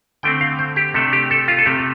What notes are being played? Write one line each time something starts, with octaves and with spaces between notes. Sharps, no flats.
D3 A3 C4 G5
F5
C5
G4
C3 A3 D4 A4
G4
A4
F4
A4
C3 A3 C4 G4